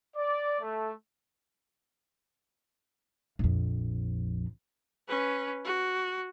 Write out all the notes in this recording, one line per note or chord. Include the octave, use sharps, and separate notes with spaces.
D5
A3
A#1 F2
C#4 B4
F#4